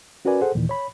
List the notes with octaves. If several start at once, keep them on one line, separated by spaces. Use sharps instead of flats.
C#4 F#4 A#4 B4 D5 G#5
G#4 A4 C5 F#5
D#2 A#2 D#3 E3
C#5 B5